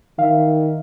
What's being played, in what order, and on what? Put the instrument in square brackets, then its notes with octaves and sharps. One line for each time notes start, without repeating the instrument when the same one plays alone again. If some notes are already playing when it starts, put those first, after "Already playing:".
[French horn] D#3 [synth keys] E5 F5